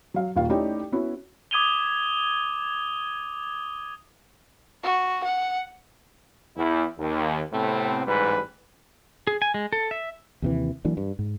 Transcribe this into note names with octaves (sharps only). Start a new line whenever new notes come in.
F#3 F5
D#1 D#2 F4 F5
A3 C#4 D#4 E4 G4 D5
B3 C#4 E4 F#4
D6 D#6 G#6 D#7 F7 G7
F#4
F#5
E2 E4
D#2
A2 C3 A3 B3 C4
A1 G#2 G3 B4
G#4
G#5
G#3
A4
E5
D#2 C3 E3
E3 F#3 A#3 D4
G2
G#2